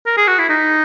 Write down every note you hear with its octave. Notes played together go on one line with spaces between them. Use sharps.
A#4
G#4
F#4
E4
D#4